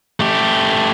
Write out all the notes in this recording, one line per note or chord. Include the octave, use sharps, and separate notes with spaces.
A3 G4